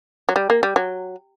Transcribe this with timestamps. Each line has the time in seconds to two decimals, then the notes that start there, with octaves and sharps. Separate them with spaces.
0.29 F#3
0.36 G3
0.50 A#3
0.63 G3
0.76 F#3